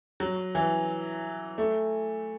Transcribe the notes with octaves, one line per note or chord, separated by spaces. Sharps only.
F#3
E3
A3